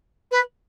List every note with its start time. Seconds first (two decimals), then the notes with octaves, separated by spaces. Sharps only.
0.31 B4